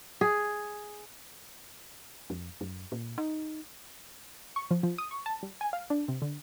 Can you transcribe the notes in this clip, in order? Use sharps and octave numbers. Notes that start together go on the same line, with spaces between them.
G#4
F2
F#2
A#2
D#4
C#6
F3
F3
D#6
C#6
A5
G3
G#5
F5
D4
C3
D3